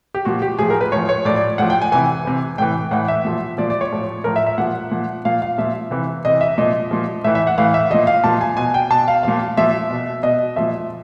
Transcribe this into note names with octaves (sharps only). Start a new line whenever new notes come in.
G4
A#2 F3 F#4
G4
A2 F3 G#4
A#4
B4
A2 F3 C#5
C#5
A2 F3 D5
D5
A2 F3 F#5
G5
G#5
C3 E3 G#5
C3 E3
A2 E3 G5
A2 E3 F#5
E5
A#2 F3
A#2 F3 D5
D5
C#5
A2 F3
A2 F3 A#4
E5
E5
A#2 F3 F#5
A#2 F3
A#2 F3 F5
F5
A#2 F3 E5
C3 E3
C3 E3 D#5
E5
A#2 F3 D#5
A#2 F3
A2 E3 E5
E5
F#5
A2 E3 F5
E5
A#2 F3 D#5
F5
A#2 F3 A5
G#5
B2 G#5
G5
B2 A5
F5
A#2 F3 F5
A#2 F3 E5
B2
B2 D#5
A#2 F3 E5